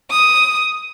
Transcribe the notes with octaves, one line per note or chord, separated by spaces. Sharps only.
D#6